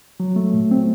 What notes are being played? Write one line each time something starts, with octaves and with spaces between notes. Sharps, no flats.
F#3
A3
A#2
C4